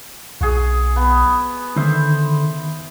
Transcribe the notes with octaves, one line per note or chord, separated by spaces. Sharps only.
B1 F#4 G#4
B3
D3 D#3 C5 E5